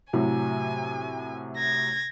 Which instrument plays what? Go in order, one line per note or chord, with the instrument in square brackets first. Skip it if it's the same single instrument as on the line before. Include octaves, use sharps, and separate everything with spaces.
[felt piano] A2 C3 F#3 [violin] G#5
[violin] G#6 A#6